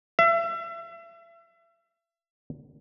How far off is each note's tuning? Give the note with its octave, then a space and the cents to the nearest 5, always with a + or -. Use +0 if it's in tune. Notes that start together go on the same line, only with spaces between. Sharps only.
E5 +35